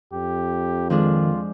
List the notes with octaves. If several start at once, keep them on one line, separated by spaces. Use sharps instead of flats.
F2 G4
D#3 F3 G#3 D4 F4